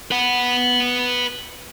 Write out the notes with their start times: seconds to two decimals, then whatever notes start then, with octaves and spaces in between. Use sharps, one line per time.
0.11 B4 F#5